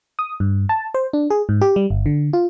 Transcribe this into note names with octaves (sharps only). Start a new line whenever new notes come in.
D#6
G2
A5
C5
D4
G#4
G#2
G4
G3
G1
D3
F4